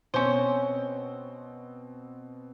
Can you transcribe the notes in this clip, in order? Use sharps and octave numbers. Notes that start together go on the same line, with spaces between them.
B2 C4 C#4 C5